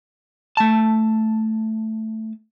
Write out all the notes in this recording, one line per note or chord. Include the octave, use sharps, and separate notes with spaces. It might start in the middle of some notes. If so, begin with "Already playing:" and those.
A3 A5